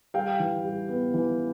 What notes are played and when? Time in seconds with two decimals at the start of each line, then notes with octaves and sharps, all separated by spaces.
0.14 G3 F5 G5
0.40 E3
0.64 G3
0.89 B3
1.14 E3